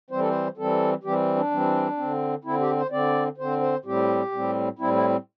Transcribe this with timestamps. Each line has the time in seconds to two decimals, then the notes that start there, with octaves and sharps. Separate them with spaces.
0.10 E3 G3 C4 C5
0.19 A4
0.28 C5
0.57 E3 G3 C4 A4
1.03 E3 G3 C4 G4
1.36 D4
1.51 E3 G3 C4
1.97 D3 C4
2.44 D3 C4 E4
2.60 G4
2.76 C5
2.91 D3 C4 D5
3.37 D3 C4 C5
3.61 C5
3.85 A2 G3 C4 G4
4.31 A2 G3 C4
4.79 A2 G3 C4 E4
4.95 E4